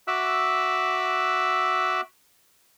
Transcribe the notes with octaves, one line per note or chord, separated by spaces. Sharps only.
F#4 E5 D6 E6 F#6